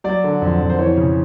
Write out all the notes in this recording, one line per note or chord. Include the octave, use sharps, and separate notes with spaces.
F#3 D5
D3
F2
F2
C5
E3 C#5
C#3